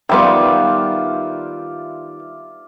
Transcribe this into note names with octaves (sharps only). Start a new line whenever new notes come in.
D#3 G3 B3 F4 D5 E5